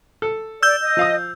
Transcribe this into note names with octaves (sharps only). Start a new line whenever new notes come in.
A4
D5 E6 G6
D#5
F3 F5 D#6